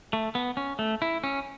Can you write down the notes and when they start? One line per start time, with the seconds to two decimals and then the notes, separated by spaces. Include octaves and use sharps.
0.13 A3
0.35 B3
0.57 C#4
0.79 A3
1.02 E4
1.24 C#4